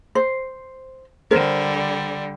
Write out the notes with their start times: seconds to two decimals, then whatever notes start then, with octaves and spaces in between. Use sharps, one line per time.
0.15 C5
1.31 D3 G3 A#4 C5